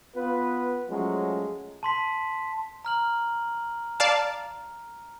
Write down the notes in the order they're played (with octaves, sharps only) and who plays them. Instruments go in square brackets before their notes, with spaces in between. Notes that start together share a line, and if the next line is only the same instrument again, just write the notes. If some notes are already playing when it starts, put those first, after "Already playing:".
[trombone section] B3 F4 B4
F3 F#3 G#3 A3 C#4 F#4
[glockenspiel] A5 C6 B6
A#5 F6 F#7
[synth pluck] D5 F5 A5